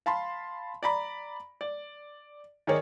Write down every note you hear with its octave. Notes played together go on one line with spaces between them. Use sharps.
F5 A5 B5 C6
D5 A#5 B5
D5
D#3 G#4 A#4 C#5 D5